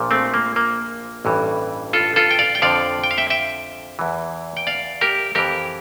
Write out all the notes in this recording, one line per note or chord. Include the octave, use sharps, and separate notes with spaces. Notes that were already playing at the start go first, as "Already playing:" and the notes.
Already playing: A#1 A#2 F3
A3 C4
A#3
A#3
A1 G2 E3
F4 A4
F4 A4
G5
D5 F5
G5
F2 D3 F3 D5 F5
G5
F5
E5 G5
E5 G5
E2 E3
G5
D5 F5
G4 A#4
F2 E3 G4 A#4